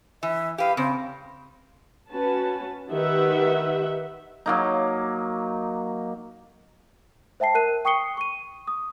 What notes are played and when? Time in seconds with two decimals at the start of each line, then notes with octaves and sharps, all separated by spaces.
0.23 E3 E5
0.58 G4 B4 F5
0.77 C#3 C4
2.10 C#4 F#4 B4 A5
2.90 D#3 G4 B4 E5 F#5
4.46 F#3 A#3 D#4
7.40 C5 E5 G5 A5 C7
7.55 A#4 F#6 D#7
7.85 G5 C#6 D#6 C7 C#7 G7
8.17 C#6 D#7
8.68 D#6